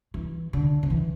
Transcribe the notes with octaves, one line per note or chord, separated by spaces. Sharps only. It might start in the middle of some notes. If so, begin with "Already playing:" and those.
E3
D3
D3
E3